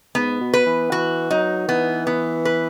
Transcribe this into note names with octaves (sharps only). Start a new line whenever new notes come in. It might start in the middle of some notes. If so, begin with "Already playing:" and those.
G#2 B3
B2
B4
E3
E3 F#4
F#3 D#4
E3 B3
B3
B4